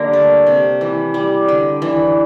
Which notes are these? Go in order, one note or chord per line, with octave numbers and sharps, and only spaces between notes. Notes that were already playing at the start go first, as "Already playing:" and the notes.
Already playing: D3 G3 A#3 D4 A#4
A3
C3
E3
G3
D3
E3